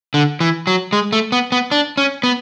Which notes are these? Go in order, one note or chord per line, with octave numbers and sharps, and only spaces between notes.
D3
E3
F#3
G#3
A3
B3
B3
D4
C#4
B3